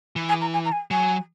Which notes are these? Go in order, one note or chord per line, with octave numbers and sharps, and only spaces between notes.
E3
G#5
A#5
G#5
A#5
G#5
F#3 G#5